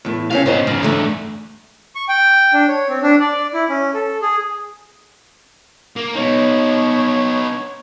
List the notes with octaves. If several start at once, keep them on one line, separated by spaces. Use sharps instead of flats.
E2 A2
C3 C4 C#4 F5
G#2 C#3 B3 D#4 C5
E2 G#2 C#3
D3 A3
C#6
G5
D4
C#5
C4
D4
D5
E4
C#4
A4
G#4
A#3
B3 D#4 C#5